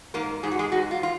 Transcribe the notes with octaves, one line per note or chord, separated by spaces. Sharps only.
G#2 A#3 A#4
G#2 G#4
F#4
G#3 G#4
G#2 F#4
F4
F4